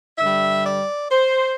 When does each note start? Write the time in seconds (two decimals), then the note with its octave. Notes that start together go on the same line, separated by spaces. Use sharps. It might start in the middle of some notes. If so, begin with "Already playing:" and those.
0.18 G2 D3 G3 E5
0.64 D5
1.09 C5